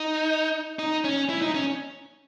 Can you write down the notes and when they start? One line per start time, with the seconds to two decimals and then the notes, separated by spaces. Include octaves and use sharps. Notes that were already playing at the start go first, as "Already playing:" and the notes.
Already playing: D#4
0.79 D#4
1.04 C#4
1.29 E4
1.42 D#4
1.55 C#4